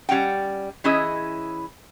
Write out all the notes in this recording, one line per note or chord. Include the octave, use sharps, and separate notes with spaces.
G3 C#4 F#5 G5
E3 C#4 E4 G#4 D#5